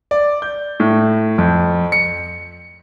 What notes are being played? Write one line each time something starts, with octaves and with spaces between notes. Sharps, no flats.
D5
G6
A2
F2
C#7